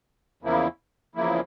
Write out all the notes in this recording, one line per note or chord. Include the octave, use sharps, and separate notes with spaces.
E2 C#3 F3 A#3 E4
E2 C#3 F3 A#3 E4